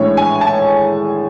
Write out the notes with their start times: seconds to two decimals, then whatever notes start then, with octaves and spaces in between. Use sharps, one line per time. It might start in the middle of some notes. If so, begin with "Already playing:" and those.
Already playing: A2 E3 G#3 D4 C#5
0.17 G#5
0.41 A5